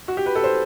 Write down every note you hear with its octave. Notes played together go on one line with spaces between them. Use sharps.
F#4
G4
B4
A4
C5